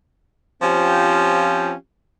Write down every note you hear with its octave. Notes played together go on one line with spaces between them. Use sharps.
F3 C4 C#4 F4 G4